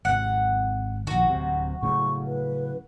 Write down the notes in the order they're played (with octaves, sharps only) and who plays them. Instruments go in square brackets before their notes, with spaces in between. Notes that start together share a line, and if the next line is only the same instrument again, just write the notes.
[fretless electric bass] G#1 C3 [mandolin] F#5
[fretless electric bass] A#1 D#3 [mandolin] F#4
[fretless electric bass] D1 C3
[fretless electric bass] A2 C#3 F#3 [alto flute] C#6
[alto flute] B4